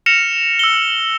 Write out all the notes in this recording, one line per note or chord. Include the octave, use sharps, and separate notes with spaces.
F6 A#6 C#7 E7 F7
E6 G7